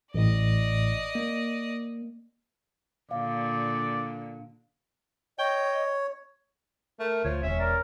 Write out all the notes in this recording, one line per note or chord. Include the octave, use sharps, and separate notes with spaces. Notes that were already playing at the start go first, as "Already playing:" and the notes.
A1 A2 D5 D#5
A#3
A#2 D3 D5 F5
C#5 D#5 G5
A3 A#4
D2 F3 C#5
E1 C#4 E5
A#4 D5